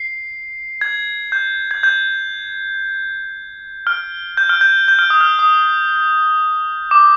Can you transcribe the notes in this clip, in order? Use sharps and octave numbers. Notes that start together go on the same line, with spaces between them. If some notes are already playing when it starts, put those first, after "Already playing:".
Already playing: C7
G#6
G6
G#6
G6
F6
G6
F6
G6
G6
F6
D#6
F6
D#6
D6